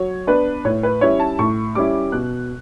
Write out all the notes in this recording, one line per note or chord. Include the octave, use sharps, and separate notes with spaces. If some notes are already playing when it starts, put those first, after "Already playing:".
Already playing: F#3 C#5
B3 D4 B4
A2 C#5
B4
G3 C#4 E4 C#5
A5
A2 C#6
G3 C#4 E4 D6
B2 F#6